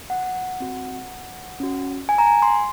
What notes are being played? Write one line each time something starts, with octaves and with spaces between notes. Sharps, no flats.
F#5
C4 F#4
C#4 F#4
G#5
A#5
G#5
C6